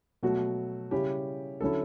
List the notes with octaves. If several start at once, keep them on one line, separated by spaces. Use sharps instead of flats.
B2 F#3 A3 F#4
C#3 G3 C#4 E4 G4
D3 F#3 C#4 E4 A4